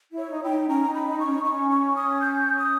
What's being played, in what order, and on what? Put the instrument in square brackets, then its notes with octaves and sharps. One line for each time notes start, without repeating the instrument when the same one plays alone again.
[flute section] E4
[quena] C#5
[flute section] D#4
[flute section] E4 [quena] G5
[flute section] D#4
[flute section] C#4 [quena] A#5
[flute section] D#4
[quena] B5
[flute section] D#4
[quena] C#6
[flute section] C#4
D#4
[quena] C#6
[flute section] C#4
[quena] C#6
D#6
G6
D#6